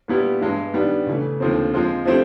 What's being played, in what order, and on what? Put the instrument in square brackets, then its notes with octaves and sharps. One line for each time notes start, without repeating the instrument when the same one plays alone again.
[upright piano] A#2 G3 B3 E4 G4
G2 E3 G#3
D#3 G3 B3 D4
C#3 E3 A3
D#2 D3 F3 A3 C4
F3 G#3 C4 F4
F3 A3 C4 E4 G4